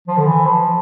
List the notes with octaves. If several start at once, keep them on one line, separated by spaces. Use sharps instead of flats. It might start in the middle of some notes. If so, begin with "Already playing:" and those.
F3
D3
E3
F3